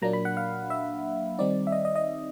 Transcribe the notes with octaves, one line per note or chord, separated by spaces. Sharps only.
A#2 F#3 A#3 D4 A#5
B5
F#5
F5
E5
D#3 G3 C4 D#4 D5
E5
D#5
D#5
D#5